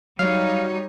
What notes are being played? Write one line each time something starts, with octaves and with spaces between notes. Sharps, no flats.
F#3 G3 D#4 C#5 F5